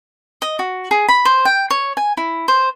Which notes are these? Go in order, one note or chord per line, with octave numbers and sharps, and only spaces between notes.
D#5
F#4
G#4
B5
C5
G5
C#5
G#5
E4
C5